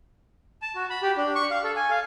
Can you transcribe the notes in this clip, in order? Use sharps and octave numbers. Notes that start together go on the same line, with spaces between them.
A5
F#4
B5
G4
D4
C#6
F5
A4
G#5
F5